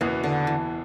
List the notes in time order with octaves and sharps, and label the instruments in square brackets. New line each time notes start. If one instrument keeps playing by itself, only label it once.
[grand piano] F#1 E2 B2 B3 F#4 [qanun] E3
[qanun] D3
E3